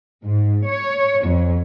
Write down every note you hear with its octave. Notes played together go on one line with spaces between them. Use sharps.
G#2
C#5
F2